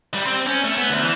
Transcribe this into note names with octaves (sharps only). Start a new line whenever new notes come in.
G3
C4
C#4
A3
B3
D2
E3